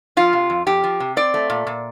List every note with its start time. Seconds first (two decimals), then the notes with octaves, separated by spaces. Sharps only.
0.17 F3 F4
0.33 C3
0.50 F2
0.66 F2 G4
0.84 F3
1.00 C3
1.17 C4 D5
1.34 A3
1.50 A#2
1.67 A#2